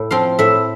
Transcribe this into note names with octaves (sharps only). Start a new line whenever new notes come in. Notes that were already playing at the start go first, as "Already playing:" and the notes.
Already playing: A2
F3 C4 F4 F5
A2 E5